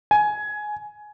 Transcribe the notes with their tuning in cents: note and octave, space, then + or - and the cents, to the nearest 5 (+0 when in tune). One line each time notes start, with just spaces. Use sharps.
G#5 +15